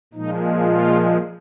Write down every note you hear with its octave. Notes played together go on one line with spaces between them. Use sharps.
A#2 F3 G#3 D#4
F4